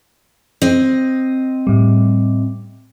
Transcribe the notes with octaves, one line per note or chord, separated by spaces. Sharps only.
C4 D#5
A2 G3